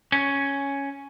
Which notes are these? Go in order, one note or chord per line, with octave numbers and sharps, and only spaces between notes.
C#4